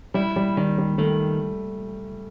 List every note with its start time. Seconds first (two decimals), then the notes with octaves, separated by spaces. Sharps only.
0.14 G3 E4
0.36 G3
0.57 D#3 G3
0.78 G3
0.98 D#3 A3